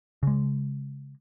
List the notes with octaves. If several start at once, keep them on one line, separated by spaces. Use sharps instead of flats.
C#3 G#3